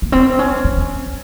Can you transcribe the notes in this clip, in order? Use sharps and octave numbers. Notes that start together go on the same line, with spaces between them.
A#3
C4
C#4
C#4